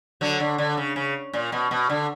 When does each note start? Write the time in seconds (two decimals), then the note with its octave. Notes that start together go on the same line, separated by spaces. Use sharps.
0.21 D3 F#3
0.40 D3
0.58 D3
0.77 C#3
0.96 C#3
1.33 A#2
1.52 B2
1.71 B2
1.90 D3